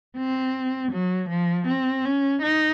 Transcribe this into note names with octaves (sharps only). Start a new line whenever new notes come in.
C4
F#3
F3
C4
C#4
D#4